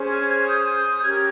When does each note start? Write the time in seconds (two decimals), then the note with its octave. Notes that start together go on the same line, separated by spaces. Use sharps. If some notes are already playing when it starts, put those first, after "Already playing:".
Already playing: C#4 G#4 C5
0.09 F6 G#6
0.28 F6 G#6
0.46 D#6 G6
1.02 C#4 G4 A#4 F6 G#6